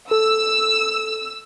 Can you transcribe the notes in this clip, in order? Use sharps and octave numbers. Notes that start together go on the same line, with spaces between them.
A4 E6